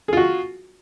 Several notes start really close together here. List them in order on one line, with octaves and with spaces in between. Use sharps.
G#4 F4 F#4